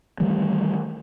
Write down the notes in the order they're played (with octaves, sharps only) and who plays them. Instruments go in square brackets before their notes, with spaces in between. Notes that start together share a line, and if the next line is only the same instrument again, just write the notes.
[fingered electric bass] D#3 E3 G3 A3